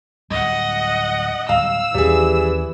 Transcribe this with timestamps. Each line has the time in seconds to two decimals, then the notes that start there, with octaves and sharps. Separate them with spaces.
0.31 D1 G3 D#5 F#5
1.49 D1 G3 F5 E6
1.95 D#2 E3 G3 C#4 G#4